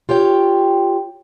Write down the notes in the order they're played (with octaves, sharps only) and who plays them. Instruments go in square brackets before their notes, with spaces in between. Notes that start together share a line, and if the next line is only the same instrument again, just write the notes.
[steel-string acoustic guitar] F4 G4 C#5 G5